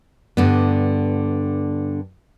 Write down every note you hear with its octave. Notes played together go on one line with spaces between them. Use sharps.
G2 D3 B3